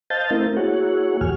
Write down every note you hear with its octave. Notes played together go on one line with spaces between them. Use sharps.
C5 D#5 F5 A5 G6 A6
A3 C4 E4 A#4
A#3 E4 F#4 G#4 C#5 F#5
E2 G#2 E3 G4 G#5 F6